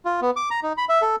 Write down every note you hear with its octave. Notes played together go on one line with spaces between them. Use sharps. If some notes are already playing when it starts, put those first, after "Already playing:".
F4
B3
D6
A#5
D#4
B5
E5
A4